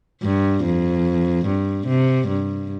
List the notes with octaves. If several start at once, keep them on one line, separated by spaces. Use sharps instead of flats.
G2
F2
G2
C3
G2